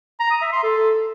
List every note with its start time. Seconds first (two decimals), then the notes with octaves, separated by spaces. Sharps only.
0.20 A#5
0.31 D#6
0.42 E5
0.52 C6
0.63 A4